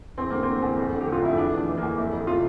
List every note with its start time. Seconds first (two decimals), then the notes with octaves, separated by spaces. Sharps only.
0.17 E2 C4
0.30 D3 A#3
0.43 D3 C4
0.62 E2
0.77 F2
0.92 D3
1.01 G4
1.07 D3 F4
1.22 F2 E4
1.37 E2 D4
1.52 E3
1.57 D4
1.67 E3
1.77 E2 A#3
1.97 F2 E4
2.12 F2
2.27 C3 F4